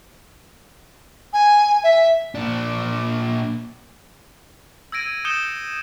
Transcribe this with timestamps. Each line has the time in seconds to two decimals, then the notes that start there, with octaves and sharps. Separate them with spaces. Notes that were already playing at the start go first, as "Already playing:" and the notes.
1.33 G#5
1.84 E5
2.35 A#2 D4
4.92 E6 G#6 A#6 D7 D#7
5.25 D#6 G6 A#6 C#7 E7 G7